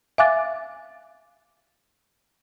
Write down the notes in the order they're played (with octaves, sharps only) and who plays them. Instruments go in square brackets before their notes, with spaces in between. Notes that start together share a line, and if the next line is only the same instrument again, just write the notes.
[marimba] E5 F5 G#5 D6 F#6 A6